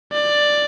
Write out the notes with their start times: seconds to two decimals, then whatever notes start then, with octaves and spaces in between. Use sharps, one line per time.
0.13 D5